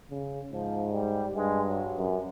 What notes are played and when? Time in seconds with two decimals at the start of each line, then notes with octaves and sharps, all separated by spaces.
0.10 C#3
0.52 G#2 F3
0.91 G3
1.35 G2 G#3
1.68 F#3
1.98 F#2